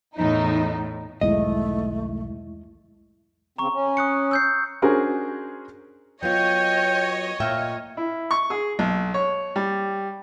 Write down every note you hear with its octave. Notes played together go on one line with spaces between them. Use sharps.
E2 A2 D#4
B1 E2 G#2 D#3 G#3 A3 E4 D#5
C#3 C4 A#5 C#6
C#4
D#6 F#6 C#7
E6 G6 C7
C#4 D4 F#4 G#4 A#4 C5
F#3 B3 F4 C#5 D#5 G5
A#2 E5 F5 G5
E4
C#6
G#4
B1
C#5
G3